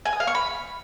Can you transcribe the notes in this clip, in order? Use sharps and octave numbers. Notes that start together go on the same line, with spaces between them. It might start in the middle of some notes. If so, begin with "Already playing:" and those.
G#5
D#6
F5
C#6
B5